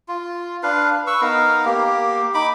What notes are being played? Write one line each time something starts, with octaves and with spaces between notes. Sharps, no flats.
F4
D4 B4 F5
B4 C#6 E6
B3 D#4 A#4 F5
A#3 G4
D#4 B5 D6